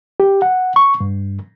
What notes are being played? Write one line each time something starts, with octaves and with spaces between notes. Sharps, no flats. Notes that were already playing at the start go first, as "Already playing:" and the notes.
G4
F#5
C#6
G2